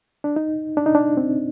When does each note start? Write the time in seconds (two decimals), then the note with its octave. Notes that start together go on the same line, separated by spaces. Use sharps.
0.24 D4
0.36 D#4
0.77 D4
0.86 D#4
0.95 D4
1.17 C4